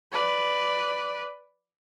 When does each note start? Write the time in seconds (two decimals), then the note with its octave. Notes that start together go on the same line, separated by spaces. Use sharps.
0.12 B4 D5